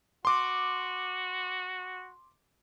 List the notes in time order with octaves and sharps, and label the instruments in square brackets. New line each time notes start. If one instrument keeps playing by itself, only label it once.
[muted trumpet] F#4 [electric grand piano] C6 D6